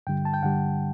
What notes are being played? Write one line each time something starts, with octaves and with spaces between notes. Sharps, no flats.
G2 D3 G3 G5
A5
G5
G2 D3 G3 F#5